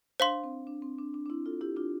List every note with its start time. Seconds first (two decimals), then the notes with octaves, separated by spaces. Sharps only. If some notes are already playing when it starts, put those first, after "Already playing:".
0.20 D4 C5 F5 C6
0.44 C4
0.67 D4
0.82 C4
0.98 D4
1.14 D4
1.26 D4
1.29 C4 E4
1.46 F4 A4
1.61 E4 G4
1.76 D4 F4